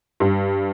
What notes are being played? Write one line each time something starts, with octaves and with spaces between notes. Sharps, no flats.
G2